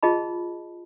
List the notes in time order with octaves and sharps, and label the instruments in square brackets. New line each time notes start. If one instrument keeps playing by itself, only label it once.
[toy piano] F4 G#4 D#5 A5 B5